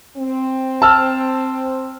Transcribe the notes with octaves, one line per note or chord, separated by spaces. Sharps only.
C4
A5 E6 F6